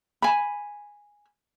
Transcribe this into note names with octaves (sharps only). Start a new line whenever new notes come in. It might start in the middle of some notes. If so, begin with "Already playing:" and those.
G#5 B5